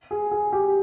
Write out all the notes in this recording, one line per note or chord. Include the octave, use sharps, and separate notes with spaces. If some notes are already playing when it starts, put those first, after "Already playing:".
G#4
G#4
G4